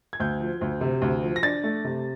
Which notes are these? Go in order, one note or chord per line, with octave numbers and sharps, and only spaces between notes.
G#6
D2 G6
F3
D2
C3
D2
F3
A#6
D4 A6
A3
C3